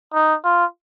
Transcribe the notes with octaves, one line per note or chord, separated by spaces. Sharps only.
D#4
F4